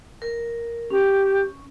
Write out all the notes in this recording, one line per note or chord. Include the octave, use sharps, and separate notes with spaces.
A#4
C#4 G4